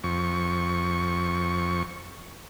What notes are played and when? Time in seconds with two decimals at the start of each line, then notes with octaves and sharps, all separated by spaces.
0.04 F2 C#6